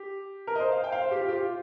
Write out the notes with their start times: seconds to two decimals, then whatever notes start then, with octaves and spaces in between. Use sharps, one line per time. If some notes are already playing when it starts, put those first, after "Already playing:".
Already playing: G4
0.47 A#4
0.55 D#5
0.60 C5
0.72 F5
0.84 G5
0.92 F5
1.01 C5
1.11 G4
1.20 F4
1.28 G4
1.38 F4